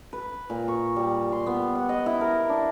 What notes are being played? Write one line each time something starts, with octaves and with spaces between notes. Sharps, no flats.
B4
A#2
C#6
G3
C6
B3
F#5
D#5
E4
A#4
D4